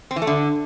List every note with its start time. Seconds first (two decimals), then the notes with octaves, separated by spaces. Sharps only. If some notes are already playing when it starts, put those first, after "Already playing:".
0.11 C4
0.16 E3
0.22 A3
0.27 D3